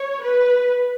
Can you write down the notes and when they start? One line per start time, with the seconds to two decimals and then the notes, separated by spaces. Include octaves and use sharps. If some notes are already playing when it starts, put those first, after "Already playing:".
Already playing: C#5
0.23 B4